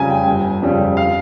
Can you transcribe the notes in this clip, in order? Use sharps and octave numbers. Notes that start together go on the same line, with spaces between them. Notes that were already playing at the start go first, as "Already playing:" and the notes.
Already playing: F2 C#3 G3 G#5 A#5
G5
G1
F2 C#3 G3
F5